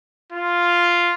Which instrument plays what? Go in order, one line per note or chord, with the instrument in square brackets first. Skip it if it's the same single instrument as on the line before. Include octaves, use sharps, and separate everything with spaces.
[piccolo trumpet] F4